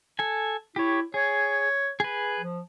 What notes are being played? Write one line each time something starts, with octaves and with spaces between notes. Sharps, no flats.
A4 G#5
E4 G4 C#5
G#4 C#5
G#4 B4
F3